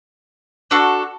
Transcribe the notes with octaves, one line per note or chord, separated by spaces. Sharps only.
D4 F#4 A4